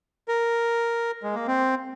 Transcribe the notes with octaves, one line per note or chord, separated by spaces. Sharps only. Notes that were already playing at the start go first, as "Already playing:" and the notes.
A#4
G#3
A#3
C4